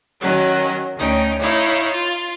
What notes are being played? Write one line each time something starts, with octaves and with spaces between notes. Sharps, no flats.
D#3 F#3 C#4
D2 C#4 D#4 G5
D#4 E4 C#5 F5
F4